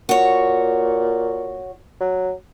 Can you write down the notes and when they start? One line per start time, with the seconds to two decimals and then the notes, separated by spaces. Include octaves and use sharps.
0.09 A#2 F#4 C#5
2.01 F#3